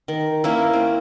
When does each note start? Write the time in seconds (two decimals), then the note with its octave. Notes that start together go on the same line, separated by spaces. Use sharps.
0.08 D#3
0.44 A#3 C#4 E4
0.73 C4